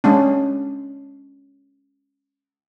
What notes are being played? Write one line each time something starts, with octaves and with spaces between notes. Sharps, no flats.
G#3 C#4 D4